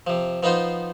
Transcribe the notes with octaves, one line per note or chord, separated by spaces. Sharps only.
C3 F3
F3 B3 D#4 F4 C5